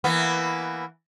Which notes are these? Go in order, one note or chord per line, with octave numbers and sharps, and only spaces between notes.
E3 A#3 B3